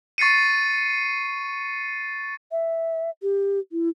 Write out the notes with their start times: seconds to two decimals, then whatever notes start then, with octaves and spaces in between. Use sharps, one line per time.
0.18 C#6 A6 C7 C#7 D#7
2.52 E5
3.22 G4
3.72 E4